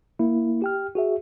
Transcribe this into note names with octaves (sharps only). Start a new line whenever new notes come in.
A#3 E4
G4 G5 F6
F#4 G#4 E5